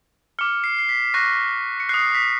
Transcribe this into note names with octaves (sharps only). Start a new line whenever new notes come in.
D6 F6 C#7
C7
C7
B6
C#6 F#6 A#6
C#7
D#6 F#6 C7
B6